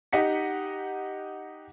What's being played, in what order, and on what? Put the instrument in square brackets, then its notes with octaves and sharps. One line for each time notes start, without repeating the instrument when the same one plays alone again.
[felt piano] D#4 G4 D#5 F#5 B6 C#7